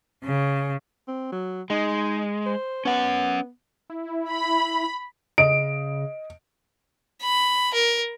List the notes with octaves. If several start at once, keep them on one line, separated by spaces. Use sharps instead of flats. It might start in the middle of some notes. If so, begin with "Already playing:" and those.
C#3
C4
F#3
G#3 D#4
C5
B3 C#4 F#5
E4
B5
C#3 D#5 D7
B5
A#4